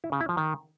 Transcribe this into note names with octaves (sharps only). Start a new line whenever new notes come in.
E4
C#3
E4
F3
D#3